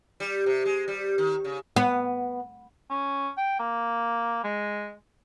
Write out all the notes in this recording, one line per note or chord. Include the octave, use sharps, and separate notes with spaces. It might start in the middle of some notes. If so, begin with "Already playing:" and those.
G3
C3
G#3
G3
D#3
C#3
B3
C#4
G5
A#3
G#3